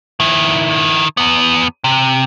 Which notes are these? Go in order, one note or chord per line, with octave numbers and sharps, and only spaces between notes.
D#3 E4
E2 B3
C3